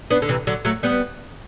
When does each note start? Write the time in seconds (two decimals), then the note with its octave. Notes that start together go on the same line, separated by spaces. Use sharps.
0.10 B3 D4
0.22 D3
0.29 C3 E3
0.47 D3 F#3
0.65 F#3 A3
0.83 G3 B3